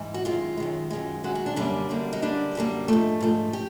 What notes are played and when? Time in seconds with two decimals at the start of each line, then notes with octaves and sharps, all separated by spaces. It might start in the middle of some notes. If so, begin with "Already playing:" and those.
Already playing: G#2 E3
0.14 F#4
0.25 F#2 D#3 G#3 F4
0.57 F#2 D#3 G#3
0.90 F#2 D#3 G#3
1.23 F#2 D#3 G#3 F#4
1.35 F#4
1.46 D4
1.56 F#2 D3 G3 A#3 D4
1.89 F#2 D3 G3 A#3
2.13 D#4
2.22 F#2 D3 G3 A#3 D4
2.55 F#2 D3 G3 A#3
2.88 G#2 F3 A3
3.20 G#2 F3 A3
3.53 G4